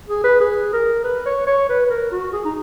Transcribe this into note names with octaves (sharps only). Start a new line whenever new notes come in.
G#4
B4
G#4
A#4
B4
C#5
C#5
B4
B4
A#4
F#4
G#4
D#4